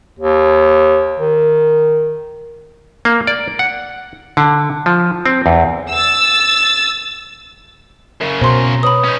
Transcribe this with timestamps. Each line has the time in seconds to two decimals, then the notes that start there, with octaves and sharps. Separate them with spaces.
0.19 D#2
1.20 D#3
3.05 A#3
3.27 D5
3.59 F#5
4.37 D3
4.86 F3
5.26 C4
5.46 E2
5.91 E6 A6
8.21 F#2 C#3 A#4
8.41 B2 C5 A#5 C6 A#6
8.83 B4 C#5 B5 D#6
9.05 C#4 D#4